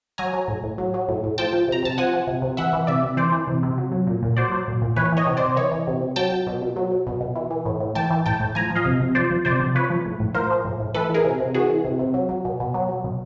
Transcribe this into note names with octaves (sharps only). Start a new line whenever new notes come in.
F#3 G#5 A#5
F#3
A2
A2
F#3
F#3
A2
A2
F3 G5 A5
F3
C3 A#5
C3 A5
F3 F#5 G#5
F3
C3
C3
E3 E5 F#5
E3
C3 D5 E5
C3
E3 C5 D5
E3
C3
C3
F#3
F#3
A#2
A#2
F#3 C5 D5
F#3
A#2
A#2
E3 B4 C#5
E3 C#5 D#5
C3
C3 C5 D5
E3 C#5 D#5
E3
C3
C3
F#3 G5 A5
F#3
B2
B2
F#3
F#3
B2
B2
E3
E3
A2
A2
E3 G5 A5
E3
A2 G5 A5
A2
F3 G#5 A#5
F3
D#5 F5
C3
C3
F3 C5 D5
F3
C3 C5 D5
C3
F3 B4 C#5
F3
A2
A2
F3 A#4 C5
F3
A2
A2
E3 A4 B4
E3 G#4 A#4
C3
C3
E3 F#4 G#4
E3
C3
C3
F#3
F#3
B2
B2
F#3
F#3
B2